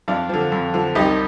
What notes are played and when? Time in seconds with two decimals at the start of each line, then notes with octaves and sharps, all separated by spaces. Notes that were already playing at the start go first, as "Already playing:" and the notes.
0.08 F2 D4 F4
0.29 D3 F3
0.52 F2
0.74 D3 F3
0.95 C2 D#4 G4